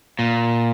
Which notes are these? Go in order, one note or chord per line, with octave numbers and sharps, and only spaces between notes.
A#2